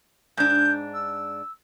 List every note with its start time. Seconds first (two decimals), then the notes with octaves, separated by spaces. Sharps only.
0.37 G#2 D4 G6
0.93 E6